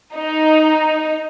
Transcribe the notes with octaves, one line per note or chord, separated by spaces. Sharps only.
D#4